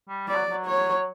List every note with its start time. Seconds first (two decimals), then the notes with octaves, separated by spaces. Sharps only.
0.09 G3
0.28 G3 D5
0.35 F#3
0.50 F#3
0.66 C#5